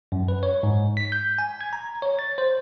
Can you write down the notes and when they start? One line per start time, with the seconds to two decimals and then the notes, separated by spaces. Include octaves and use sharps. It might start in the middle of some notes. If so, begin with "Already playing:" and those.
0.12 F#2
0.28 B4
0.43 C#5
0.63 G#2
0.97 B6
1.12 G6
1.38 G#5
1.61 G#6
1.73 A#5
2.02 C#5
2.19 A6
2.38 C5